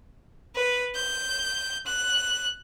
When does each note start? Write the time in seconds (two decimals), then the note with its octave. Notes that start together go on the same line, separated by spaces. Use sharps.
0.55 B4
0.95 G6
1.87 F#6